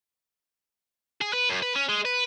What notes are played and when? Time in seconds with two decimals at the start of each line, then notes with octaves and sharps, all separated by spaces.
1.21 G#4
1.33 B4
1.49 F#2
1.62 B4
1.76 C#4
1.89 G#3
2.05 B4